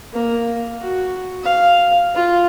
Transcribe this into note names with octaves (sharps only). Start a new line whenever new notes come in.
A#3
F#4
F5
F4